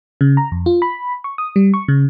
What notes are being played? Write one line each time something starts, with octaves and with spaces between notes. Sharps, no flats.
C#3
A#5
F2
F4
B5
C#6
D#6
G3
C#6
C#3